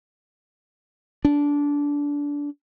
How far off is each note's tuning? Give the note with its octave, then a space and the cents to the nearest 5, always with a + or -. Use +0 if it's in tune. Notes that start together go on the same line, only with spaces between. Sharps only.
D4 -20